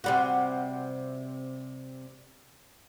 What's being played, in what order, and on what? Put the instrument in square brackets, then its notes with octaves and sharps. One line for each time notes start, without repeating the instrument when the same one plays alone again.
[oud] C3 G3 F#4